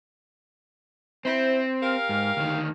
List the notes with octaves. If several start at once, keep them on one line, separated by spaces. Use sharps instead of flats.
C4 E4 C5
G4 A#4 F5
G#2
D2 D#3